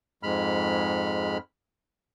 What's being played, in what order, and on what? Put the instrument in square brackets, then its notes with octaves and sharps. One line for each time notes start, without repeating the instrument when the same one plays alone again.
[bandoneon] F2 G#2 G#3 B5 F6